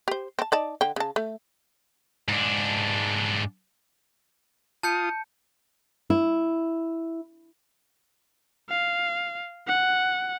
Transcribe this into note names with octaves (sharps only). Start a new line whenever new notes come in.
G4 C5
C4 A5
D#4 D5 A5
D3 G5
C#3 A5
A3
G#2 D4
F4 A5 D#6 G6 C#7
E4
F5
F#5